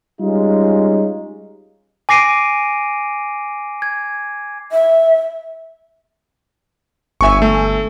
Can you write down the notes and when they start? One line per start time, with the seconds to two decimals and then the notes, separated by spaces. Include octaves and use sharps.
0.20 G3 G#3 C#4 D#4 F4
2.09 G#5 D6 A#6 C7 D7 D#7
3.82 G#6
4.72 E5
7.21 G1 E5 G#5 C#6 E6
7.42 A3